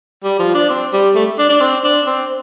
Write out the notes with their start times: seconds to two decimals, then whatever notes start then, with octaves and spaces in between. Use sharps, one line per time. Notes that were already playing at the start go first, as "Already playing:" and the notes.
0.24 G3
0.39 F3
0.55 D4
0.69 C4
0.93 G3
1.15 A3
1.39 D4
1.49 D4
1.60 C4
1.84 D4
2.07 C4